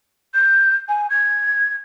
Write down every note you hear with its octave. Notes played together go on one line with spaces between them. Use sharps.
G6
G#5
G#6